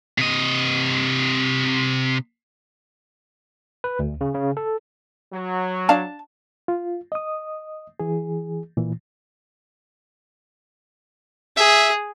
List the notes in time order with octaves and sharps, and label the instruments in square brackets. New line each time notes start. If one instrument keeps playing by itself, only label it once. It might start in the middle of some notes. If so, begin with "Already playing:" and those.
[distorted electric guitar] C3 D#5
[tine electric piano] B4
D2
C#3
C#3
A4
[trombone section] F#3
[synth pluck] D4 F5 [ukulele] A5
[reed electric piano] F4
D#5 D#6
E3 G#4
A#2 E3
[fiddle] G#4 [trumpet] E5